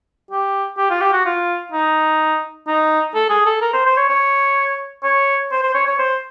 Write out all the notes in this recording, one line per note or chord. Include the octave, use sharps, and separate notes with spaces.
G4
G4
F4
G4
F#4
F4
D#4
D#4
A4
G#4
A4
A#4
C5
C5
C#5
C#5
C#5
C5
C5
C#5
C#5
C5